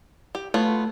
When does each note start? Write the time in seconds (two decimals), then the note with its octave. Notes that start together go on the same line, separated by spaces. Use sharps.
0.35 G4
0.54 A3 B3 F4 C#5